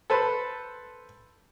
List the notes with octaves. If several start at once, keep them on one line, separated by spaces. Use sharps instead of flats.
A4 B4 C5